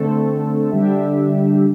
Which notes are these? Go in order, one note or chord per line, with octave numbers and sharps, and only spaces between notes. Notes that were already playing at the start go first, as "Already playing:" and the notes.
Already playing: D3 A3 C4 A4
D3 G3 D4 G4 E5